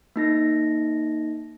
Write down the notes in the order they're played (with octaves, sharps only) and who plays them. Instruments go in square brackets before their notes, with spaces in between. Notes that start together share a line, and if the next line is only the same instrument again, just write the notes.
[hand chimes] A#3 D#4 A#6